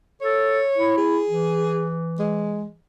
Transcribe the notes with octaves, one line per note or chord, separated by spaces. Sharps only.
A4 C#5
E4
G#4
E3
G#3